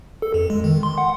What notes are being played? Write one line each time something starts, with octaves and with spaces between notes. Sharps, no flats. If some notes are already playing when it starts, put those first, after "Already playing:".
A4
F2
G#3
D#3
C6
F#5